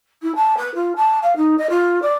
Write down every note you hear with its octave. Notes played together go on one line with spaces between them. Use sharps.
E4
A5
B4
F4
A5
F5
D#4
D#5
F4
D5